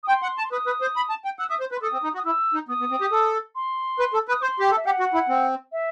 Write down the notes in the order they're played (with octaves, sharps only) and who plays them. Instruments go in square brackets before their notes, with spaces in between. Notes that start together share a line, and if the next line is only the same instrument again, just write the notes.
[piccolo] D#6
[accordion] G5 [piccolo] C6
[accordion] F#5
A5
[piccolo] C6
[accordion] B4 [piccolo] D#6
[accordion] B4
C5
B5
A5
G5
[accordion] F#5 [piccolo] E6
[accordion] E5 [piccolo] D#6
[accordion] C5
B4
[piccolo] C6
[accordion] A4 [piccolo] D#6
[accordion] C4
D#4
F#4
[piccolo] D#6
[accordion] E4 [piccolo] E6
[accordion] D#4
[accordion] B3 [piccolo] D#6
[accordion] B3
C4
G4
A4
[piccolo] C6
[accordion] B4
A4
B4
[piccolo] D#6
[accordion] C5 [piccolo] C6
[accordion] G4
A4
[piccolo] E5
[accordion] G4 [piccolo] F#5
[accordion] F#4
E4
C4
[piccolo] E5